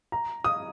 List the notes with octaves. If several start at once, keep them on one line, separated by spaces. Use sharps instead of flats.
A#5
D#6